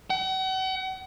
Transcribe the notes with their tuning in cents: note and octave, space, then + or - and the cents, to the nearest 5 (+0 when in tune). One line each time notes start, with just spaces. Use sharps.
F#5 +40